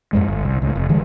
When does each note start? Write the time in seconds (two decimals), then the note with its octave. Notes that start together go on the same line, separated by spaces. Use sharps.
0.13 F2 G#2 G#3
0.27 G1
0.45 C2
0.62 C#2 A2
0.75 F1
0.89 D3 E3 G3 G#3